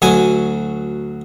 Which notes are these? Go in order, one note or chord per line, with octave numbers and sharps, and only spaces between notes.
D2 F#3 G#5